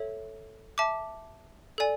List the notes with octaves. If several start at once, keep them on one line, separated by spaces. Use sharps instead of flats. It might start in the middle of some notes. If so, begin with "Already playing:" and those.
Already playing: A4 C#5 E5
E5 A5 D6
A4 D5 G#5